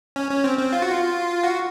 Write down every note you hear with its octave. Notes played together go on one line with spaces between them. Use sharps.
C#4
C#4
C4
C4
F4
F#4
F4
F#4